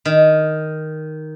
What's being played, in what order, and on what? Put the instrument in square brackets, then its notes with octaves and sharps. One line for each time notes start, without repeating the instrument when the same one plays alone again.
[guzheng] D#3